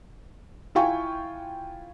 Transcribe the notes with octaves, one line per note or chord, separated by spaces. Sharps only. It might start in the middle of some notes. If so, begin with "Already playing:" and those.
E4 F4 F5 G5 G#5 C#6